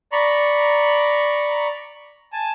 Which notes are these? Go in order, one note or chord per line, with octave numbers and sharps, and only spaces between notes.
D5 A#5 B5 C#6
G#5 A5